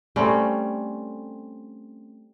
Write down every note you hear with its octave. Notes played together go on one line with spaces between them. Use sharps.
G3 A3 C4 C#4